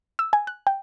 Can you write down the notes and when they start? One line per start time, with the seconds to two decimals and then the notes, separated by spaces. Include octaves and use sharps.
0.19 E6
0.33 G#5
0.47 F#6
0.67 G5